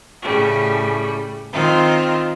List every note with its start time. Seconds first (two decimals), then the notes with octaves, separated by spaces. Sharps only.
0.22 A2 C#3 G3
1.52 D#3 C4 F4